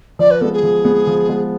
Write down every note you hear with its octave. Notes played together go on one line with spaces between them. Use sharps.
F3 D5
B4
G#3 B3 A4
G#4
F3
G#3 B3
F3
G#3 B3